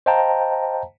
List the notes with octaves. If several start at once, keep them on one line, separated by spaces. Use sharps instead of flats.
C5 D#5 F5 G5 A5 A#5